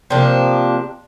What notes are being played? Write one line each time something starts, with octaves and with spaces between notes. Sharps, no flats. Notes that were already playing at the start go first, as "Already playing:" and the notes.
C3 F3 A#3 D4